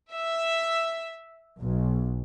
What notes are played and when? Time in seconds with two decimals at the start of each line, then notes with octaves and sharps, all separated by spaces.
0.12 E5
1.60 B1